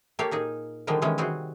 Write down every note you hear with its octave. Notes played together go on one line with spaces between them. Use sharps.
A#3 G4 A4 C#5 F5
A#2 D#4 G#4
D3 D#3 F3 G3 G#3 A#3
C3 D#3 E3 G#3 C#4
G3 C4 F#4 G#4